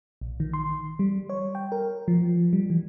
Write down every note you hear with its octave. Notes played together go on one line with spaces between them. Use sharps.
A#1
D#3
C6
G3
C#5
G5
A#4
F3
G3
E3